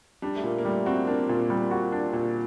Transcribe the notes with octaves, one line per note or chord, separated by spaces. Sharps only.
G3 D4
A3
A#2 A#3
A#3
G3 A3
C4 F#4
A#3 D4
A#2
G3
F#4
D4
A#2